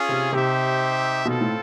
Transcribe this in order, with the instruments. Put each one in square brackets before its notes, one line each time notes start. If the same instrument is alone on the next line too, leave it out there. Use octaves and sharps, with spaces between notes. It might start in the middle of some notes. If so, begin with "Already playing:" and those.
Already playing: [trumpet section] C#4 F4 G#4
[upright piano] C3
[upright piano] C3 [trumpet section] D#4 G4 C5 E5
[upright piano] B2 [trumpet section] C4 F4 A4
[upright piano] A2